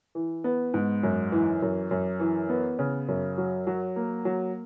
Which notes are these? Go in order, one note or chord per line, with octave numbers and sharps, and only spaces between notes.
E3
B3
G#2
F#2
E3
F#2
F#2
E3
B3
C#3
F#2
F#3
F#3
A#3
F#3